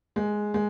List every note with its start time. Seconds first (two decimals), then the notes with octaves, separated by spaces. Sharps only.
0.16 G#3
0.54 G#3